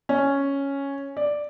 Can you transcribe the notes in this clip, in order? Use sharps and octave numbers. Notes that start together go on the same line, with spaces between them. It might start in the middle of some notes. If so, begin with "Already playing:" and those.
C#4
D5